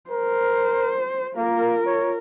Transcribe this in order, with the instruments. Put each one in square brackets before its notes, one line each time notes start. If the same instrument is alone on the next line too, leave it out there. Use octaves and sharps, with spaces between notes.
[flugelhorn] A#4 [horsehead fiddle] C5
[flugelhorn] A#3 [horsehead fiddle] F4 A#4
[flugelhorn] C#5